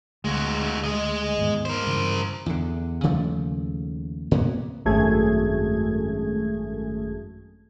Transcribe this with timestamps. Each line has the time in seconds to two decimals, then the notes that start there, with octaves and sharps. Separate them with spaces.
0.25 D2 G#3 F#4
0.84 G#3 D#5
1.37 D#2 G#2 B3
1.65 A#4 C5
1.86 G2 C#3 E3
2.46 E2 D3
3.03 D#2 C#3 F3 A3
4.31 A2 C3 A#3 B3
4.85 G#1 F#2 A3 G#4 G#6